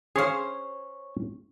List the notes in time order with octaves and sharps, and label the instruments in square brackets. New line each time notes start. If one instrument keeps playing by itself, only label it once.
[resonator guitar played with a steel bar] C#4 C5 [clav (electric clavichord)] G#4 C#5 F5